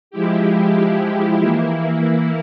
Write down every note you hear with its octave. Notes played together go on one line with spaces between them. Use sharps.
F3 G#3 E4 G4
E3 A#3 E4